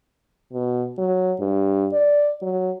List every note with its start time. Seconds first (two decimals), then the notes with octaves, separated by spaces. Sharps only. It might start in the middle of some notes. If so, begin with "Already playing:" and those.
0.53 B2
0.98 F#3
1.40 G2
1.93 D5
2.42 F#3